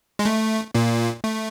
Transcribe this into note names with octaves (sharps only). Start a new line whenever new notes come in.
G#3
A3
A#2 A#3
A3